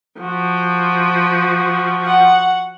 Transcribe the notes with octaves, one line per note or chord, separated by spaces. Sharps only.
F3 F#4
F#5